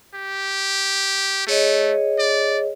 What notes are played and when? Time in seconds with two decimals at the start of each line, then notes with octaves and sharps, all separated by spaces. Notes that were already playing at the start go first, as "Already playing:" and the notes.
0.14 G4
1.47 A3 G#4 C#5 D#5
2.19 D5